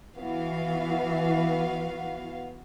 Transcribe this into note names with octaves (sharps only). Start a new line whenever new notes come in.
E3 B3 F#4 F5